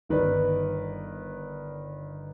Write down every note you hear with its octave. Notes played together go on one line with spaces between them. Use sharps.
G1 D#3 B4 D5